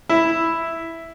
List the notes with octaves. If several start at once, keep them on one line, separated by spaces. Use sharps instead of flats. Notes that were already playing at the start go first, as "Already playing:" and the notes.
E4